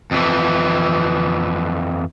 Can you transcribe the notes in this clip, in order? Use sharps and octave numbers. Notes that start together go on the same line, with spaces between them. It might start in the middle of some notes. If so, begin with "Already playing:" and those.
F2 E3